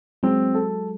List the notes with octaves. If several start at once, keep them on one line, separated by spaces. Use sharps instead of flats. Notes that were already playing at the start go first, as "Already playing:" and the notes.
F#3 G#3 C4
A4